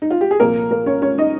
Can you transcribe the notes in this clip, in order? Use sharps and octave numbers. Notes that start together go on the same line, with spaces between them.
D#4
F4
G4
G#4
C2 A#2 F3 A#3 A#4
A#3 A#4
C#4 C#5
C#4 C#5
D#4 D#5